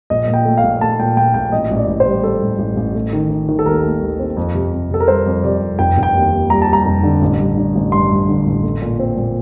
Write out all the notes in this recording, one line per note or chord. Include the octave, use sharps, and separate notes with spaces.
A#1 D#5
A#2
G5
A3
F5
A#1
A3 A5
A#2 G5
A#2 G5
A#1 G5
A1 D#5
A1
D5
A1
C5
G3
G3 A4
A1
A1
A1
A3
D#3
D#3
D#3
A4
D#2 A#4
A3
D#2
C4
F2
C3
F2
C3 A4
A#4
G3 C5
F2
C3 D5
F2
F1 G5
F1
G5
D#2
D#2
G3 A#5
A5
G3
A#5
F1
D3
A1
G2
D3
A1
G2 C6
G2
D3
A1
A3
A#2
C4
A#2